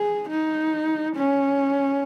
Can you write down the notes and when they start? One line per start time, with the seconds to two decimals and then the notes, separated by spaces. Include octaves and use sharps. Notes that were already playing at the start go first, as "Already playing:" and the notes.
Already playing: G#4
0.30 D#4
1.17 C#4